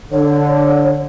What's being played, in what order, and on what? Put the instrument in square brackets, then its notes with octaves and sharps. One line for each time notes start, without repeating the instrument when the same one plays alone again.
[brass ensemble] D3 [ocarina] C#5